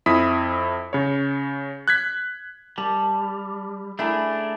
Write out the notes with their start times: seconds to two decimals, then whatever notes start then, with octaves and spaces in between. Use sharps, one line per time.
0.06 F2 E4 D#6 B6
0.93 C#3 C#5
1.88 F#6 G#6 B6
2.78 G3 A5
3.99 A3 D4 E4 G#4 A#5